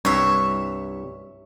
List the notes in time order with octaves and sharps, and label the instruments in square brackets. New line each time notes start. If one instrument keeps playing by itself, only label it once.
[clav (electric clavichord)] C2 G2 [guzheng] C#5 E5